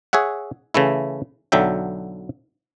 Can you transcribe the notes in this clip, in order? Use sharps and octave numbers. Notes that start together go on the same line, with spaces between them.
G#4 C#5 E5 F#5
C#3 E3 A3 E4
B1 D3 F#3 E5 G5